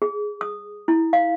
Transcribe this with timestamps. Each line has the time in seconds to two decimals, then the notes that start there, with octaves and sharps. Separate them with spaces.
0.02 G#4
0.41 D#6
0.88 E4
1.13 F5